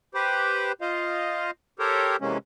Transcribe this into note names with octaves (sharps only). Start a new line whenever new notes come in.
G4 B4 C5
F4 C5 D#5 F5
G4 A4 A#4 C5 C#5
C3 E3 G#3 A#3 C#4